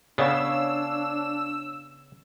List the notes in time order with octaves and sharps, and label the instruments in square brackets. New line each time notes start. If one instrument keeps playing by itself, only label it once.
[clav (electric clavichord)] C#3 B3 [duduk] D4 [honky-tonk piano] C#5 D5 F5 [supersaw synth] E6